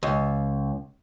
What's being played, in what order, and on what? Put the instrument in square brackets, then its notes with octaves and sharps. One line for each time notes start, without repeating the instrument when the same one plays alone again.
[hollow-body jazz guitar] C#2